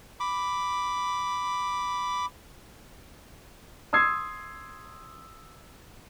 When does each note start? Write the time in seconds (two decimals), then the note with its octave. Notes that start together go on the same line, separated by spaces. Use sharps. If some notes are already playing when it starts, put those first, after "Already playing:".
0.20 B5 D6
3.93 C6 D#6 E6 G#6 C7